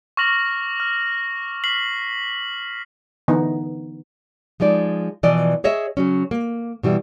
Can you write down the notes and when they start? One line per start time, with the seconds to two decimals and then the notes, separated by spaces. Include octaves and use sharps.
0.17 C#6 D6 F6 A#6 F7 F#7
0.80 F6
1.64 F6 B6 C7 F#7
3.28 D3 E3 B3 D#4
4.60 F3 G#3 D#4 D5
5.23 B2 E3 F3 D5 D#5
5.64 G#4 C#5 D#5 E5
5.97 C#3 F#3 C#4
6.31 A#3
6.83 B2 E3 G3 E4